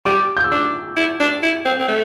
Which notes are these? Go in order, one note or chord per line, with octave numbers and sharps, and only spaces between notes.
G3 D6
G6
E6
D4 D6
E4
D4
E4
C4
C4
A3